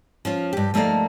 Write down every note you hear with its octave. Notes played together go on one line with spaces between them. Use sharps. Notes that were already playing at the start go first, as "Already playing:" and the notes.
F3 C#4 F4
G2 G4
F3 A3 A#3 D#4 D5 F5